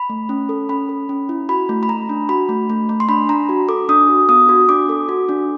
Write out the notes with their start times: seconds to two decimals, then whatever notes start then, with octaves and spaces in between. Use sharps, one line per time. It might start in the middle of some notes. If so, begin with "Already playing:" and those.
Already playing: B5
0.09 A3
0.29 C#4
0.49 A4
0.69 C#4 B5
0.89 A4
1.09 C#4
1.29 E4
1.49 F#4 B5
1.69 A3
1.83 B5
1.89 A3 A#5
2.09 D4
2.29 F#4 B5
2.49 A3
2.70 A3
2.89 A3
3.00 C6
3.09 D4 B5
3.29 D4 A#5
3.49 F#4
3.69 A4 D6
3.89 D4 D#6
4.09 F#4
4.29 B3 D#6
4.49 F#4
4.69 D4 D6
4.89 A4
5.09 F#4
5.29 D4